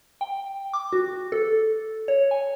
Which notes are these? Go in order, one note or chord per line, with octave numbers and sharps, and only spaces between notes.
G5
D6
F#4
A4
C#5
G#5